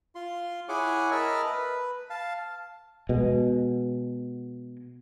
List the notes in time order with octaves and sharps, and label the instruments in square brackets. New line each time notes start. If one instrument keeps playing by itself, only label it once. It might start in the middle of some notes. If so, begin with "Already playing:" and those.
[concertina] F4 C6
E4 G#4 C#5 F#5 G#5 D6
A#4 D#5 E5 A5 B5 F6
B4
F5 A5
[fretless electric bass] B2 G#3